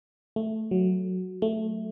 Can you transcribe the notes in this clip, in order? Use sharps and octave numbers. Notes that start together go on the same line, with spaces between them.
A3
F#3
A3